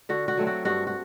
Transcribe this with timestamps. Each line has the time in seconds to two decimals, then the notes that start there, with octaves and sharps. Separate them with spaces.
0.09 D3 F#4
0.28 F#4
0.37 F#3 A3 C4
0.47 F#4
0.65 G2 F#4
0.87 F#4